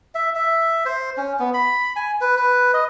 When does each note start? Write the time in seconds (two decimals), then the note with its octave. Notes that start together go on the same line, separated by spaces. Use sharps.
0.15 E5
0.35 E5
0.85 C5
1.17 C#4
1.39 B3
1.54 B5
1.96 G#5
2.21 B4
2.37 B4
2.74 D#5